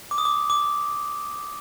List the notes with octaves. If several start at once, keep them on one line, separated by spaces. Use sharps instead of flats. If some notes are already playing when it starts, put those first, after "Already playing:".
D6
D#6
D6
D6